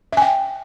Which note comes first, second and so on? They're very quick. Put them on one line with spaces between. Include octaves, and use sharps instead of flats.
E5 G#5 G5